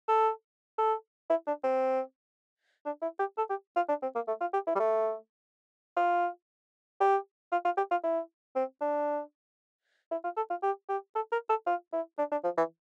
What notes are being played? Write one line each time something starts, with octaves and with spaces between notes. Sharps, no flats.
A4
A4
E4
D4
C4
D4
E4
G4
A4
G4
F4
D4
C4
A#3
A3
F4
G4
E4
G3
A3
F4
G4
F4
F4
G4
F4
E4
C4
D4
E4
F4
A4
F4
G4
G4
A4
A#4
A4
F4
E4
D4
D4
F3
E3